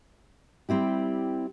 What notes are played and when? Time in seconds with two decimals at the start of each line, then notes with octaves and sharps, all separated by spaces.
0.69 G3 C4 E4 G4